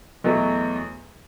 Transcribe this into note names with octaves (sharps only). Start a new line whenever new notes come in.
E2 B2 F#3 A3